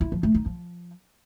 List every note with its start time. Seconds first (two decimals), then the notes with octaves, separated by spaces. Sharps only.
0.01 E4
0.12 F3
0.23 A3
0.34 D#4
0.46 F3